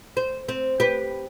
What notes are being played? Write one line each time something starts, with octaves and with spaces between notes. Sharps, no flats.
C5
C4
G4 B4